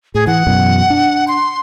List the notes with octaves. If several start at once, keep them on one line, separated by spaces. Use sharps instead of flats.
A2 G#4
E3 F#5
F#2 B2 E3
D4
C6